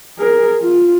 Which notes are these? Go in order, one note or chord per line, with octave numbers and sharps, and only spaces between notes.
G#4 A#4
F4